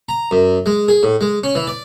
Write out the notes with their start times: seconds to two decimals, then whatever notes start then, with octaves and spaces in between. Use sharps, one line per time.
0.09 A#5
0.31 F#2
0.66 G#3
0.88 G#4
1.03 A2
1.21 G#3
1.44 C#4
1.55 E3
1.67 D5